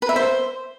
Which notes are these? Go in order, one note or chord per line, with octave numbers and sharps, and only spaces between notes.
B4
E5
C5